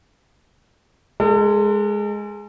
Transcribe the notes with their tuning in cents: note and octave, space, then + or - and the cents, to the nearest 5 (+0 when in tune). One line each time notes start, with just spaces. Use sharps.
G#3 +0 A4 +40